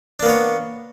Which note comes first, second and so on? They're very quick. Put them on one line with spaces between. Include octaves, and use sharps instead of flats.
D4 A#3 B3 C#5